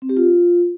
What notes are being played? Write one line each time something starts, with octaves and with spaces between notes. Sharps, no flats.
C4
G4
F4